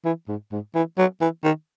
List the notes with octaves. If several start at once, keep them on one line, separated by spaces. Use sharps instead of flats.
E3
G#2
G#2
E3
F#3
E3
D#3